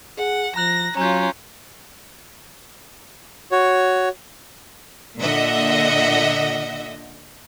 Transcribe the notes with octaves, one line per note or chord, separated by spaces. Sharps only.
G#4 F#5
F3 A#5 F#6 A#6 F#7
F#3 C#4 F4 A#5 G6
F#4 C#5
A#2 D3 D#5 E5 F#5